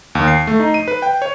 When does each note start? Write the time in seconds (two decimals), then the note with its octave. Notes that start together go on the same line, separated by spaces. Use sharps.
0.15 D#2
0.28 C7
0.47 A3
0.60 D#4
0.74 D#7
0.88 B4
1.02 G5
1.22 C#5